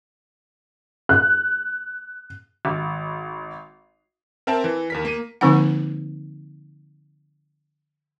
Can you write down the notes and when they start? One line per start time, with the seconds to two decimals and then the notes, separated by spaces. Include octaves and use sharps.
1.09 F#6
2.65 G#1
4.47 C4 A#4 E5 G5 A5
4.64 E3
4.90 D#2 A#4 B6
5.05 A#3 D#7
5.41 D3 F3 A#3 C4 D#4 F#5